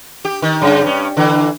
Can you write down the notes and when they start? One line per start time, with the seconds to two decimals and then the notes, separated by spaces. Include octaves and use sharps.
0.25 G4
0.42 D#3
0.62 F#2 C#3
0.84 G2 C#4
1.17 D3 E3